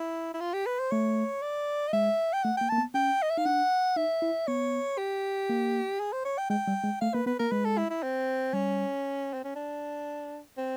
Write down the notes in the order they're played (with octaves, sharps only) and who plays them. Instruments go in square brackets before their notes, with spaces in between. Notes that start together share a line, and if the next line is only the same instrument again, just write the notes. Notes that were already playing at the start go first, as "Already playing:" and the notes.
Already playing: [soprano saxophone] E4
E4
F4
G4
B4
C5
[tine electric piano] A3 [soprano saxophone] C#5
[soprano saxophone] D5
D#5
[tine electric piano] G#3 [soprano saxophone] E5
[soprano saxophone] G5
[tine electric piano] A3 [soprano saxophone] F#5
[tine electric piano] A#3 [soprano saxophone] G5
[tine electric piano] A#3 [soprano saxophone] A5
[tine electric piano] B3
[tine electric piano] C#4 [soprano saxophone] G5
[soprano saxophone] D#5
E5
[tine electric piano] D#4 [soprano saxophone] F5
[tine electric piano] D4 [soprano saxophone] F#5
[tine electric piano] D#4 [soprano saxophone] E5
[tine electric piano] E4
[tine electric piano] B3 [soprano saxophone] C#5
[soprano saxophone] G4
[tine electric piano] A#3
[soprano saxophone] G#4
C5
C#5
G5
[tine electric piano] G#3 [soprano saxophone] G5
[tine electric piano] G3
G#3
[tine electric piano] A3 [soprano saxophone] F5
[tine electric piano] A#3 [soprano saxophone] B4
[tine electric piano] B3 [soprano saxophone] B4
[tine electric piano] A#3 [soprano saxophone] A#4
[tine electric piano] G#3 [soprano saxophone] B4
[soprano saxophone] A4
E4
E4
C4
[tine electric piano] G3 [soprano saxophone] C#4
[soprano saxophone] C4
C#4
D4
C4